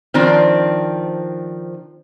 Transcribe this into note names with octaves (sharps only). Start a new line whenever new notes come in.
D#3 F3 C4 D4